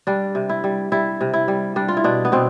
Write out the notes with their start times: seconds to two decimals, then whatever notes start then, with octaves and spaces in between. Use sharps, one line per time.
0.07 G3 D4
0.35 C3
0.49 E4
0.64 G3
0.92 G3 E4
1.21 C3
1.33 E4
1.48 G3
1.76 G3 D4
1.88 F4
1.97 E4
2.04 B2 D4
2.25 B3
2.32 B2 C4